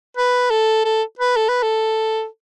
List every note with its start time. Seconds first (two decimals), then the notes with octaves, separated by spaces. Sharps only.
0.17 B4
0.51 A4
0.85 A4
1.19 B4
1.37 A4
1.49 B4
1.63 A4